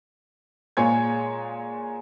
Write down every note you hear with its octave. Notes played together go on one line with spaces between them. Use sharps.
A#2 G#3 G#4 C#5 G#5 G#6